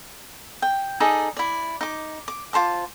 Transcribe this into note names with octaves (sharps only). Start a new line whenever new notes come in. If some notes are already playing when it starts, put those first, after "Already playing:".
G5
D#4 G#4 A4 D5
E4 D5
D#4 D6
D6
F4 C5 A5 D6